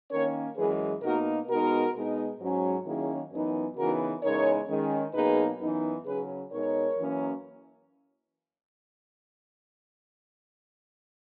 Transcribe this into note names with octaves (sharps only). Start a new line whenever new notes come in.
D#3 A#3 C#4 A#4 C#5
F#2 E3 G#3 G#4 B4
B2 A#3 D#4 F#4 A#4
B2 G#3 B3 D#4 F#4 A#4
B2 G#3 B3 D#4
G#2 F#3 C#4
D#3 F#3 A#3 C#4 E4 G#4
F#2 E3 B3 D#4
C#3 E3 B3 D#4 F#4 A#4
E2 C#3 G#3 D#4 A#4 C#5
D#3 G#3 C#4
B2 F#3 A#3 D#4 G#4 B4
F#2 E3 B3 D#4
C#3 F#3 C#4 G#4 B4
B2 G#3 D#4 A#4 C#5
F#2 E3 A#3 C#4